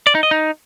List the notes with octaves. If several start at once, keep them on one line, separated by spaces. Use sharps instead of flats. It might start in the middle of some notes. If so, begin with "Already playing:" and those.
D5
D#4
D#5
D#4